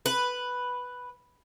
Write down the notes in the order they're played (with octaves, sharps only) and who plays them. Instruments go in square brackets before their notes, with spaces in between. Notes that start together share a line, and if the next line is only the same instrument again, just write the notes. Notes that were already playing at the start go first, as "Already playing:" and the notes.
[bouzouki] B4